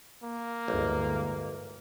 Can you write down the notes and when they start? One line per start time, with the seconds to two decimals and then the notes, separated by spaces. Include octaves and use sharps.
0.23 A#3
0.68 A1 D2 G2 G#3